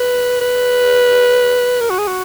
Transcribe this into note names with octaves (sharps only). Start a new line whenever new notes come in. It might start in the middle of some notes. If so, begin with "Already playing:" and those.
Already playing: B4
B4
A#4
F#4
G#4
F#4